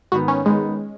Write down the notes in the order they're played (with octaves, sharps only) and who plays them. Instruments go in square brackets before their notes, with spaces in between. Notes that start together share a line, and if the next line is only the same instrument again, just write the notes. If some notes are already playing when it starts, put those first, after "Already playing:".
[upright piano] G#2 D#3 B3 D#4 [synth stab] F#4
[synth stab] C#4
[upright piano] D#3 B3 D#4 [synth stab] G#3